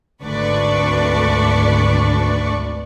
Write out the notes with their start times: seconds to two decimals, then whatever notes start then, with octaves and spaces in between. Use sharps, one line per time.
0.24 G#1 D2 D4 B4 D5 C#6